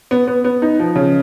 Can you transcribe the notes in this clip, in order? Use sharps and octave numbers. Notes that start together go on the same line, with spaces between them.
B3
B3
B3
D#4
F3
C#3